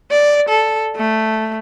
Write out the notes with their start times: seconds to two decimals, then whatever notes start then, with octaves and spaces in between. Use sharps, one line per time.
0.11 D5
0.49 A4
0.96 A3